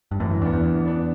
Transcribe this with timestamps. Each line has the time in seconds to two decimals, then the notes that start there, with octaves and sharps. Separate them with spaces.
0.11 G2
0.20 F#2 A2 E3
0.31 F#2
0.41 E2 B3 D4
0.53 E2
0.64 E3
0.86 B3 D4